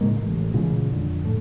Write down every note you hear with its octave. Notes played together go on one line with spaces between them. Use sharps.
A2 C#3 G#3 A#3
A1
A#2 C#3 E3 G#3
F2 D3
A2 A3